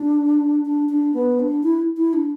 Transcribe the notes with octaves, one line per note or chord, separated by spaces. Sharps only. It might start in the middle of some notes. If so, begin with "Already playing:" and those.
Already playing: D4
D4
D4
B3
D4
E4
E4
D4